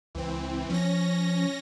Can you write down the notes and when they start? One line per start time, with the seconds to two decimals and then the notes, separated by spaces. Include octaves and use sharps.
0.15 C#2 E3 C4
0.69 F3 C#4 A#6